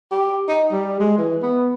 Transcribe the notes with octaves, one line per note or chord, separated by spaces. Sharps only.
G4
D#4
G3
G#3
E3
B3